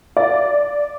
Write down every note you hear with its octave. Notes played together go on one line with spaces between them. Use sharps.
D5